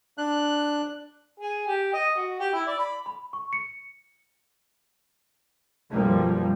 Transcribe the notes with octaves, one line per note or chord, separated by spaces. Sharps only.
D4 F#6
G#4
G4
D#5
F#4
G4
E4
D5
B5
B5
C#6
C#7
B1 F#2 F3 G3 A#3